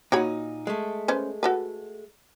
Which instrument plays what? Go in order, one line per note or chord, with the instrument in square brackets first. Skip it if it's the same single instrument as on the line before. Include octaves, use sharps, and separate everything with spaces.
[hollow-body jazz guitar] A#2 D#4 [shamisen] F#4 C#5 B5
[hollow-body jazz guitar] G#3 A3
[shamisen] C#4 B4 C5
F#4 A4 B4